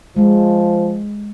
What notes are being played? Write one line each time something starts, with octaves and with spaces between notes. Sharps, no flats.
F3 G#3